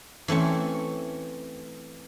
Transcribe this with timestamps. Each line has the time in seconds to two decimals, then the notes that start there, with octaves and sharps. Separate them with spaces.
0.28 E3 A3 C4 C#4